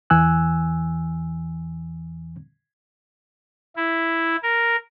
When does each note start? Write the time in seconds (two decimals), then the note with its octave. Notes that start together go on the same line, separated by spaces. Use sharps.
0.10 E2 E3 G#5 E6 F#6
3.76 E4
4.43 A#4